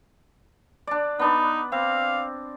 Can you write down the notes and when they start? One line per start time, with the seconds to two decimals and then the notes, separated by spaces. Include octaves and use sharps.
0.87 D4 D5
1.19 B3 D4 D#4 B4
1.72 C4 F5